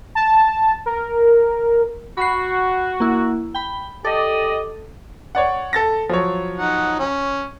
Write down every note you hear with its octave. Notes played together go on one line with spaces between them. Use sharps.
A5
A#4
F#4 B5 C7
A#3 E4
G5 B5
G4 A4 D5 D#5
C#5 D5 F#5
A4 A6 A#6
F3 F#3 C#5
D#4 F#5
C#4